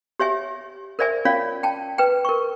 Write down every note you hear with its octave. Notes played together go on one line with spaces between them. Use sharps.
G4 C#5 E5 G#5
A#4 C5 D5 E5 G#5
C#4 F4 C#5 D5 F5
G5 A5
B4 G5
A#4 C#6